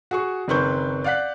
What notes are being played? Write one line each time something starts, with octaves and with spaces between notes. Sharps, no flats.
F#4 G#4 C#6
F#1 D#3 C4 B4 C#6 G6
D5 F5 F#5 F#6 B6